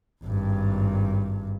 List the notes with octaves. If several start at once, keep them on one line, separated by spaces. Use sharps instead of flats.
G#1 G2